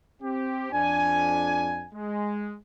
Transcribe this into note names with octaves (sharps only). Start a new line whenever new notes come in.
C4 G4
F2 D4 G#5
G#3